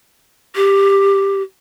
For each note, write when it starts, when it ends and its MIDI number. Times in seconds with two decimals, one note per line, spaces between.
0.56 1.42 67